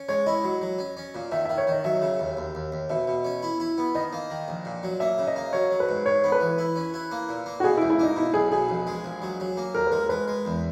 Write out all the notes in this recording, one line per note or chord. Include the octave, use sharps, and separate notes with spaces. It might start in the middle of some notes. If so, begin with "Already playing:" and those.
Already playing: C#4
G#3 C#5
E4 D#5
F#3
F#3
C#4
C#4
A#2
D#3 E5
D#3 E5
C#5
D#3 D#5
F#3 E5
C#3
D#2
D#2
D#2
D#2
B2 E5
B2
C#4
E4
E4
B3
D#3 D#5
A#3
D#3
A#1
A#2
F#3
A#3 E5
C#3
D#5
A#3
F#3 C#5
F#3
B4
G#2
G#2 C#5
B3
B4
E3
E4
C#4
E4
A#3
A#2
A#3
F#4
B2 G#4
E4
C#2
E4
A#3 D#4
B2 E4
B1 G#4
B2 G#4
A#1
G#3
A#1
F#3
F#3
A#3
D#2 A#4
B4
G#3 A#4
G#3 B4
G#3
E2